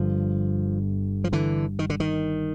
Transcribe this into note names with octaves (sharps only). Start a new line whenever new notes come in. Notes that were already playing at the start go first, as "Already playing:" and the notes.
Already playing: G1 G2 D3 F3
F3
D3 E3
D#3
D3
D#3